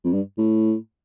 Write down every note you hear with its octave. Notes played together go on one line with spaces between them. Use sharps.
F2
G2
A2